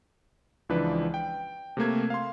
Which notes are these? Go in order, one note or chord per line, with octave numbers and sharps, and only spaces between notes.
C#2 E3 F3 D4 B4
G5
C3 A3 A#3 G#6
F5 C6